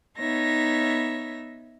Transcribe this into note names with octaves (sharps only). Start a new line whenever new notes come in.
B3 D#4 C#5 E5 A#6